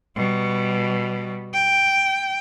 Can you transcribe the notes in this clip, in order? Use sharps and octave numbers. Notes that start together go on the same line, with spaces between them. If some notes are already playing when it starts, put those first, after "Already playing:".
B2 G3
G5